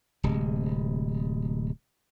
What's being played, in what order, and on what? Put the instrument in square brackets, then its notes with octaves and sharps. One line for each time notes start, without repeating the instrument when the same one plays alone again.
[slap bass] D1 C3 G#3